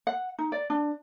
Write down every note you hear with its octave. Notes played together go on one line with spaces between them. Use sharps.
F#5
D#4
D5
D4